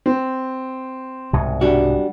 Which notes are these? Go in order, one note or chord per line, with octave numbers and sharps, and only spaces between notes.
C4
C2 G#2 B2
G3 D4 F#4